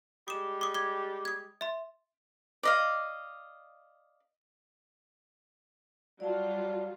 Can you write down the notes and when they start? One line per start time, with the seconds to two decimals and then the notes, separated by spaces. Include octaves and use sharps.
0.28 G3 G#3 G4 D#6 E7
0.61 D6 D#6
0.75 D6 G#6
1.25 D#6 G#6
1.61 E5 C6
2.63 D5 D#5 F5
6.20 F#3 G3 F4 D5 F5 A5